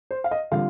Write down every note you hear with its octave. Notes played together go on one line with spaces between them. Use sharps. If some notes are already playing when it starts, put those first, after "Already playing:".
C5
F5
D#5
D3 G3 C4 F4 F5